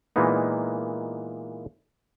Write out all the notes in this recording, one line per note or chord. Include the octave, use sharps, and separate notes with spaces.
A#2 E3 G#3 A#3 B3 D#4